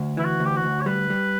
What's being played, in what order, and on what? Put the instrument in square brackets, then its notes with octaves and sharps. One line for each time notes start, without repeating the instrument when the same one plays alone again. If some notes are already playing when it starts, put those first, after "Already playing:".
Already playing: [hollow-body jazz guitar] D2
[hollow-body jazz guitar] E3 [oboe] E4
[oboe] F#4
[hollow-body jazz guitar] D2
[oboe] G4
F#4
[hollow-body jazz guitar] D2
[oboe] C#5
[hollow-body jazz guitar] G3 [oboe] B4
[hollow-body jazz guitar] G3